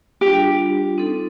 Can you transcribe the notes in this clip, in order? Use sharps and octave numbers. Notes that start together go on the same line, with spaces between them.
G3 D4 F4 G4
C4 D#4 A4